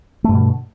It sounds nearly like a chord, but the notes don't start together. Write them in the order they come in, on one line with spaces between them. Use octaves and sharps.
A3 G2 B2 D3